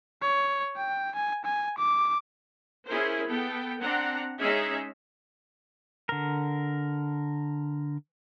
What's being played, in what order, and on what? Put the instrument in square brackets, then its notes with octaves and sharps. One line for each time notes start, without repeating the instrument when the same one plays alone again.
[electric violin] C#5
G5
G#5
G#5
D6
[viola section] C#4 E4 G#4 A#4 C5
B3 A4 G5
C4 D4 F#5 A#5
G#3 C#4 D#4 G#4 E5
[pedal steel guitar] D3 A#4